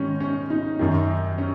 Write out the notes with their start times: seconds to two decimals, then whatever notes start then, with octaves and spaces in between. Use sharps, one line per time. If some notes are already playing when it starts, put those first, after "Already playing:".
Already playing: G#2 D#3 C#4 D#4
0.20 C#4
0.50 D#4
0.79 F#2 D#3
1.38 C#4